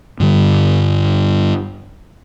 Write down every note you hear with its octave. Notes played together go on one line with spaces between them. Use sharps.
G2 D3 G3